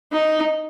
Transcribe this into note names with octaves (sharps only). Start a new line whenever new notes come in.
D#4